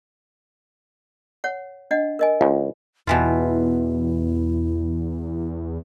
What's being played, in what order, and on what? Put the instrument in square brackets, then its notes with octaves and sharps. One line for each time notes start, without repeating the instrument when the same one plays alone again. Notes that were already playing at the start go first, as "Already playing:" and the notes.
[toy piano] C#5 F#5
D4 D#5 F#5
A#4 D#5 G#5
[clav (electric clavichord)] C#2 [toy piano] F4
[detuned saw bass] E2 [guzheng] B2 E3 F4 [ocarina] E4